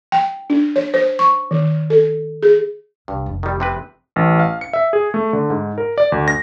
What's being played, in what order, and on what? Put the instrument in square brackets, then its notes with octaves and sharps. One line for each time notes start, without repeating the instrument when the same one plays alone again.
[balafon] G5
D4
C#5
C5
C#6
D#3
A4
G#4
[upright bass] C2 [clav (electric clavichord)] G2
[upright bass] F1 F3
[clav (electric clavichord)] D#3 G3
C3 C4 B4
[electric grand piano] A1
F5
C#7
E5
G#4
A3
D3
G#2
A#4
D5
D2
A#6